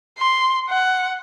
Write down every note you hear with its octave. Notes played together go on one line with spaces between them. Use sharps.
C6
F#5